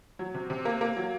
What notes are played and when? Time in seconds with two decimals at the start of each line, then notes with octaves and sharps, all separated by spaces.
0.19 F#3
0.34 C3
0.50 C3
0.65 A#3
0.81 A#3
0.97 F#3